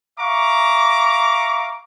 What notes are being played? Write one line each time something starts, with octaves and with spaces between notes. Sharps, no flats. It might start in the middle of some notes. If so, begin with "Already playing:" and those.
E5 F5 A#5 C#6 D6